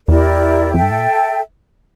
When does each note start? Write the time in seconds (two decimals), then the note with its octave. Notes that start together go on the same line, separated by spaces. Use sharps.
0.08 E2 E4 G4 A#4 D5
0.74 F2 A4 E5 G5
0.82 G2
0.91 A2
0.99 A#2